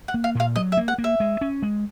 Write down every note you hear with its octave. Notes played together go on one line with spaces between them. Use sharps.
F#5
A#3
F5
A#2 F5
F#3 D#5
E5
A#3
F#5
A#3
E5
G#3
C#4
G#3